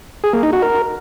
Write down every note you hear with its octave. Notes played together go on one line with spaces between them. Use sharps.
G#4
A#3
D#4
F#4
A#4